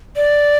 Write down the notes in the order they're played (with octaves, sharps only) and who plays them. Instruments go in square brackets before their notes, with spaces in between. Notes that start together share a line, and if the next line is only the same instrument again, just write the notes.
[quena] D5